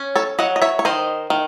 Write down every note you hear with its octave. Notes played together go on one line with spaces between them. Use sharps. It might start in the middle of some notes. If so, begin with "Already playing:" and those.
Already playing: C#4
A4 C#5
F#3 D#5 F#5
D#5
C#5 E5
C#5
D#3 C5 D#5
D#3